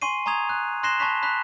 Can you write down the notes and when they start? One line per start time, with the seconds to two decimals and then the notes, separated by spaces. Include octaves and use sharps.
0.02 G#5 C6 C#6 C7 D#7
0.26 G#5 A#5 C#6 D#6 G#6 F7
0.49 F#6
0.83 C6 F#6 A#6 C7 E7 G7
0.99 A5 B5 C#6 F#6 B6 F7
1.23 B5 F#6 B6